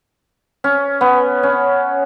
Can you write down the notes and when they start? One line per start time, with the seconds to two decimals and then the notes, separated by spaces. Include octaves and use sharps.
0.64 C#4
1.01 B3
1.43 C#4